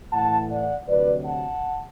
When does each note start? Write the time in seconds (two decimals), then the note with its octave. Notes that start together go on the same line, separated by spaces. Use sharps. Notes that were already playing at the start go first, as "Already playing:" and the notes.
0.12 A2 E3 A3 F#5 A5
0.50 D5 F#5
0.87 D2 C3 F#3 B4 D5
1.25 F#5 A5